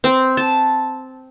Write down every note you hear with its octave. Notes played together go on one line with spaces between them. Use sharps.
C4
A5